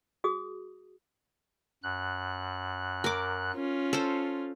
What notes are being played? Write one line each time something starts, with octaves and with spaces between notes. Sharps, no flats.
F#4 G#4 D#6
F#2 F#6
A#4 D6
C#4 F4
A4 C5